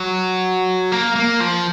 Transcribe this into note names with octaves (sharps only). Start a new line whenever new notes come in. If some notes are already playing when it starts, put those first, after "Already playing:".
Already playing: F#3
A#3
A#3
F3